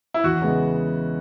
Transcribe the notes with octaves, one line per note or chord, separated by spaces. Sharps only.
E4
E2 F#4
C#3 G#3 B3 E4